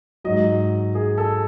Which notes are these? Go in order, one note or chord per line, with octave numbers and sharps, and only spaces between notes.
G#2 F#3 D#5
G#4
A4